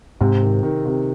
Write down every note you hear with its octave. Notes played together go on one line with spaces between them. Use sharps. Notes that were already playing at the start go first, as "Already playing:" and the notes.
G#2 C3
D#3
D#3
C3